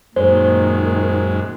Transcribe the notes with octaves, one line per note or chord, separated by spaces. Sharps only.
F#2 A#2 D#3 G#3 C5